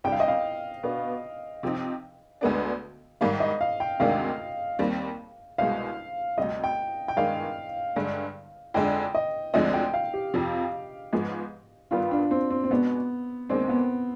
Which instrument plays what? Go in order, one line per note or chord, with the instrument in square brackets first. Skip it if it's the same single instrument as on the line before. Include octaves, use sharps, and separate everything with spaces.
[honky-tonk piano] C2 C3 G3 D4 [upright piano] G5
[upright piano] F5
D#5
F5
[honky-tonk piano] B2 B3 D4
C3 F3 C4 D#4
D2 D3 G#3 B3 D4
[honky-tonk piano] G#2 D#3 G3 [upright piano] F5
[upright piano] D#5
F5
G5
[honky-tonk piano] D2 C3 D#3 G#3 D4 [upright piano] F5
[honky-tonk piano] D#2 D#3 G3 C4
[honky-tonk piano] C2 B2 G#3 [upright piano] F5
[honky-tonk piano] D2 C3 G3 [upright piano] D#5
[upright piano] G5
G5
[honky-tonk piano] G2 D#3 G#3 D4 [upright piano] F5
[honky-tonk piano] G2 D3 G#3
[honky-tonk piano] F2 D3 G#3 D4 [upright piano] G5
[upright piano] D#5
[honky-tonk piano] D2 D3 F3 G#3 C4 [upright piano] D#5
[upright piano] G5
F5
G4
[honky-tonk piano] F2 C3 F3
G#2 F3 G#3 B3
[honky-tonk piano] G2 D#3 G3 B3 [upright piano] F4
[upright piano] D4
C4
C4
C4
[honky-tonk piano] B2 G#3 D4 [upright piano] B3
[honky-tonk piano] D#2 D#3 G#3 D4 [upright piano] C4
[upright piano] B3